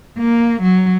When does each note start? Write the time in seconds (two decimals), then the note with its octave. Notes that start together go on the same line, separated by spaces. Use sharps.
0.18 A#3
0.62 F#3